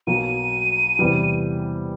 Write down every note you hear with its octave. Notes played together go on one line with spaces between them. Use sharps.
B1 B2 F#3 A#3 D#7
E2 C3 E3 G3 B3